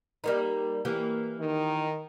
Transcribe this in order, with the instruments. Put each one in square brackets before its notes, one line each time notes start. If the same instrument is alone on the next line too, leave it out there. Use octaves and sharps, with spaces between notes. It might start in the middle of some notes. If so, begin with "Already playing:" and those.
[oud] G3 A#3 D#4
E3 A#3 G4
[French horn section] D#3